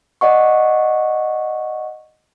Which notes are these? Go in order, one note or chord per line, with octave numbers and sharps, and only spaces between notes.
D5 D#5 F#5 C#6